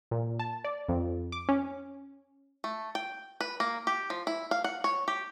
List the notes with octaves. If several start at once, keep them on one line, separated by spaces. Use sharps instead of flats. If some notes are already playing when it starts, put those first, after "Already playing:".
A#2
A5
D5
F2
D6
C#4
A3
G5
B4
A#3
G4
F3
E4
F5
F#5
C#5
G4